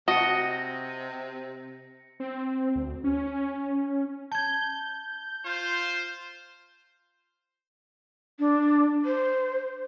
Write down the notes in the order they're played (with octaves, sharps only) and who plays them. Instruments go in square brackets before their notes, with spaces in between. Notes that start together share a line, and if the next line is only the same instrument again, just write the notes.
[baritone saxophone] C3 [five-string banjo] F#4 [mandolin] D#5 A5 [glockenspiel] A#6 C#7
[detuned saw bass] C4
D2
C#4
[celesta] A5 G#6 [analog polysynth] G6
[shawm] F4 [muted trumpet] C5
[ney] D4
[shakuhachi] C5